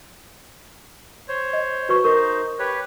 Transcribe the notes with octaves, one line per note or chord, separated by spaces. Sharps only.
C5 C#5
D#5
F#4 B4 C#6
D#4 A#4 C5 C#6
G4 B4 C#5